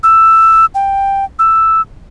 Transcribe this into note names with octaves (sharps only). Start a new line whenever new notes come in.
E6
G5
E6